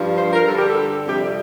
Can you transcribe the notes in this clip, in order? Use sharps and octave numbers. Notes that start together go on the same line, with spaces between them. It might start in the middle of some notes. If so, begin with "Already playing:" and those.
Already playing: G2 F3
C5
A#4
G2 D3 G3 A4
G4
A4
F2 C3 G3 G4